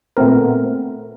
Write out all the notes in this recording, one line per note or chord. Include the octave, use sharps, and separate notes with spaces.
A#2 A3 B3 C4 A#4